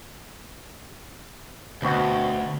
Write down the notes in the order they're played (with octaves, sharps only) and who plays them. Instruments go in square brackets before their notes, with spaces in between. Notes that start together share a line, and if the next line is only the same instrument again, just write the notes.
[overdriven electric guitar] D2 [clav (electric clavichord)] B2 C4 F#4